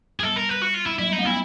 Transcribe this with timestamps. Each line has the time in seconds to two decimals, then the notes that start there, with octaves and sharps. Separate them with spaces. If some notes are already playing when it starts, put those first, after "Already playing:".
0.20 G#4
0.23 G3 A4
0.36 A#4
0.49 B4
0.62 F#4
0.74 F4
0.86 E4
0.99 F#3 E4
1.09 G3
1.12 D#4
1.19 A3
1.25 B3 E4